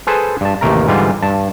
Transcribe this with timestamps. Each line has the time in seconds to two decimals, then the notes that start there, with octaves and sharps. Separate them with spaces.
0.07 G#4 A4 B4 C5
0.41 G2 A5
0.61 A1 D#2 C3 A3 A#4 A#5
0.88 G#2 D3 E3 G3 F4
1.22 G2 A5